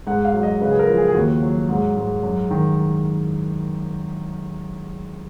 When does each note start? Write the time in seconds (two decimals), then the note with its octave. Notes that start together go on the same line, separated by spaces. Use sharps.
0.07 G#2 F#5
0.25 F5
0.34 F#3
0.43 D#5
0.61 C#3 B4
0.71 G#4
0.79 A#4
0.88 F3
0.97 G#4
1.08 G#4
1.14 D#2 F#4
1.42 F#3
1.69 G#2
1.97 G#2
2.23 F#2
2.50 D#3